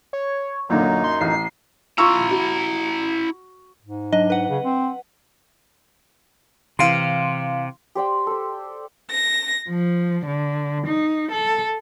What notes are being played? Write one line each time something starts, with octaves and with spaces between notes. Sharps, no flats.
C#5
F#2 A#2 D3 F#3 D#4
C6
A1 C7
E4 F4 A#5 C#6 E6
F#4
G#2
F#3 D4 D#5
B4 F#5
C#3
C4
C3 E3 F5 C6
G4 C5 D5 G5
A4 C5
A#6
F3
D3
D#4
A4